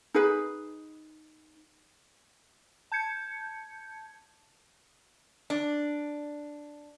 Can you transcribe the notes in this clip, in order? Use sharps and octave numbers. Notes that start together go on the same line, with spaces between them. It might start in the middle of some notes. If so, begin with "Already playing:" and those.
D#4 G#4 B4
A5 G6 G#6 C#7
D4